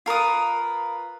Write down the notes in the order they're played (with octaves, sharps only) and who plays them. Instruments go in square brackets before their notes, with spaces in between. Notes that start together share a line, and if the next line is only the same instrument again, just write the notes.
[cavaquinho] F4 A#4 B4 D#6